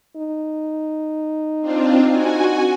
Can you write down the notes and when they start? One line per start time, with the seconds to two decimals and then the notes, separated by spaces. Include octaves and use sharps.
0.17 D#4
1.61 C4 D4 F4
2.10 F#4 G#5